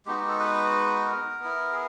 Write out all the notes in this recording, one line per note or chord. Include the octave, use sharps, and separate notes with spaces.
G#3 B3 D#4 F#4 G4
G4
A4
B4
A#4
B3
E4
G#4